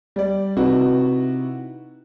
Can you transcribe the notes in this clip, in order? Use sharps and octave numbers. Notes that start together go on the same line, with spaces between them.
G3 D5
C3 D#4 E4 F#4 B4